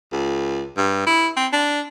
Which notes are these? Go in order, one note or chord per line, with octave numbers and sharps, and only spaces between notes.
C#2
G2
E4
C4
D4